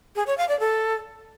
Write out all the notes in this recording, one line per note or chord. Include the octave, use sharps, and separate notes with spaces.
G#4
C#5
F5
D5
A4